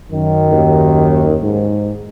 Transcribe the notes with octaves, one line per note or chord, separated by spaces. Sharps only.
F#2 D#3
D#2
G#2